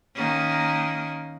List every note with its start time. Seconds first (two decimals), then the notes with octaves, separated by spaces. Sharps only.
0.16 D#3 A#3 C#4